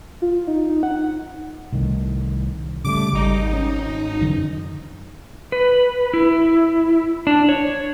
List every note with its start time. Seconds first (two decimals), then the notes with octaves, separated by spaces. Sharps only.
0.22 F4
0.47 D#4
0.69 D#4
0.83 F#5
1.73 C2 A2 D#3
2.85 C#3 G3 A3 D6
3.13 G#1 G3 D#4
3.53 C#4
4.21 F#2 D3 E3
5.52 B4
6.14 E4
7.27 D4
7.49 C#5